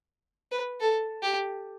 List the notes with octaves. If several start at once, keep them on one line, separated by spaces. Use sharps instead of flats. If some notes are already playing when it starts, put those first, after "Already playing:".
B4
A4
G4